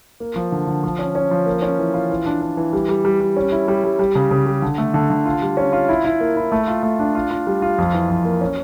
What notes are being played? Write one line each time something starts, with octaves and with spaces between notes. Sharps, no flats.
A#3
F3
D3
D3
F3
C#4
C#4
F3
A#3
C#4
E3
F4
E3
D4
D4
E3
G3
G3
G3
G3
C#4
E4
G3
G3
G3
C#3
C#3
G3
D3
A3
D3
D3
F4
G3
C#4
F4
E4
E4
A#3
E4
A3
F4
A3
D4
F4
F4
G3
F4
F2
E3
F2
A#3
C#4